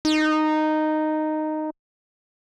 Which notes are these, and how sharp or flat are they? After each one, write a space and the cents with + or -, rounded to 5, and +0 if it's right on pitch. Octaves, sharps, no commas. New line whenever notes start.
D#4 -10